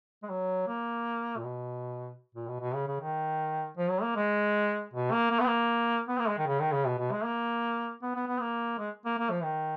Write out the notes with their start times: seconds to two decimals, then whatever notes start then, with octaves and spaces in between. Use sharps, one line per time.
0.23 G#3
0.29 F#3
0.68 A#3
1.37 A#2
1.44 B2
2.35 A#2
2.48 B2
2.61 B2
2.74 C#3
2.87 C#3
3.00 D#3
3.77 F3
3.89 F#3
4.03 A#3
4.16 G#3
4.93 B2
5.12 A#3
5.31 A#3
5.40 B3
5.46 A#3
6.09 B3
6.18 A#3
6.28 G#3
6.38 D#3
6.47 C#3
6.60 D#3
6.72 C#3
6.86 B2
6.98 B2
7.12 G#3
7.24 A#3
8.02 B3
8.15 B3
8.27 B3
8.40 A#3
8.79 G#3
9.05 A#3
9.18 A#3
9.30 F3
9.43 D#3